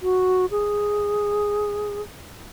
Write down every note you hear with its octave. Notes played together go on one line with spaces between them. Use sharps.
F#4
G#4